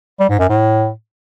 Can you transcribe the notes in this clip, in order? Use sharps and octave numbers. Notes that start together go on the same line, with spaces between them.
G3
G#2
F#2
A2